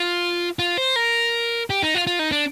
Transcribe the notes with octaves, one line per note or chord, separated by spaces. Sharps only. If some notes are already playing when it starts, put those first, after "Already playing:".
Already playing: F4
F4
C5
A#4
G4
D#4
F4
F4
D#4
D4